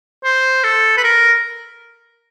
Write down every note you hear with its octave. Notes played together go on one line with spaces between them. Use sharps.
C5
A4
B4
A#4